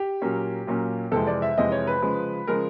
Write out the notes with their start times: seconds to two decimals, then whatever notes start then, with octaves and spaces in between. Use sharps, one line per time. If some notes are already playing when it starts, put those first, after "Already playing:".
Already playing: G4
0.22 A#2 F#3 A#3 C#4
0.67 A#2 F#3 A#3 C#4
1.11 F2 C3 E3 G#3 A4
1.27 D5
1.42 E5
1.57 F2 C3 E3 G#3 D#5
1.72 C#5
1.87 B4
2.02 C#3 F3 G#3
2.47 C#3 F3 G#3 A#4